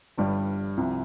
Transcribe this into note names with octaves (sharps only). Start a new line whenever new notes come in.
G1 G2 G3
C2 C3 F3